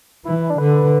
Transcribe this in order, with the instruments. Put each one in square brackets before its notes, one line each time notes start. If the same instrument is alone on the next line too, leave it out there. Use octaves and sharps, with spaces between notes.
[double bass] E3 [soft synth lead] E4
[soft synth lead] E4
D4
[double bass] D3 [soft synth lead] B4